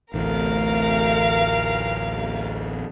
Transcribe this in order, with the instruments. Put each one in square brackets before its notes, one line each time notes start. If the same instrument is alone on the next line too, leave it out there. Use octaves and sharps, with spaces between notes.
[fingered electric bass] A1 D2 A2 [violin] A#4 F5